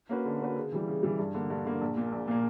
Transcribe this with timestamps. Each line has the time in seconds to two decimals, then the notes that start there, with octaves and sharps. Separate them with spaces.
0.09 A#3 C#4 F#4 B4
0.25 D3
0.40 A#3 C#4 F#4 B4
0.56 C#3
0.72 E3 G3
0.88 C#3
1.03 E3 G3
1.19 G2
1.34 D3 A#3
1.50 G2
1.65 D3 A#3
1.81 A#1
1.97 A#2 A#3
2.12 A#1
2.28 A#2 A#3